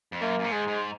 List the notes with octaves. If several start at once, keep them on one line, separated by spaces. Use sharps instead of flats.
F2
F#2 A#3
F#2
G#2
G#3
G#2